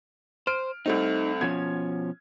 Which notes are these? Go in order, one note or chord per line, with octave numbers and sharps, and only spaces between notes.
C5 F6 D7
C2 A3 C4 D#4
B2 F3 C#4 G#6